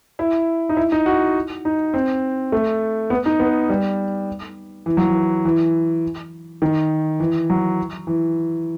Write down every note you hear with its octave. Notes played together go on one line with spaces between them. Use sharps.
E4
D#4
E4
D#4
F#4
D#4
C4
A3
B3
D#4
B3
G3
E3
F#3
E3
E3
D#3
E3
F#3
E3